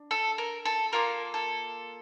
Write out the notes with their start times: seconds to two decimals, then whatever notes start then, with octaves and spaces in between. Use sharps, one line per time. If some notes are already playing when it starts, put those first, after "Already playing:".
Already playing: D4
0.11 A4
0.38 A#4
0.65 A4
0.93 A#3 F4 A4 A#4
1.34 A4